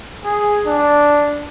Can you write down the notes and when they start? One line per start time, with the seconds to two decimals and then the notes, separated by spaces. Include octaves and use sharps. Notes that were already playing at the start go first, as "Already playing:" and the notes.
0.25 G#4
0.67 D4